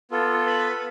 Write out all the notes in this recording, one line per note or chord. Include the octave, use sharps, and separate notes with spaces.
B3 F4 A4
B4 B5